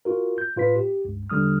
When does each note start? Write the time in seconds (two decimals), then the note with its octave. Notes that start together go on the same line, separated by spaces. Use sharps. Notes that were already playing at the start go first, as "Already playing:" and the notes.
0.05 F4 F#4 A#4
0.38 G6
0.56 A2 F4 B4 B6
0.76 G4
1.05 C#2 G2
1.30 E2 D3 G3 D#6 F6